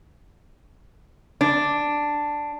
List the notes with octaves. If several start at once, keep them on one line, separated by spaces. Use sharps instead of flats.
D4